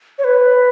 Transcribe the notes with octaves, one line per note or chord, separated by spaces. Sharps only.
C#5
B4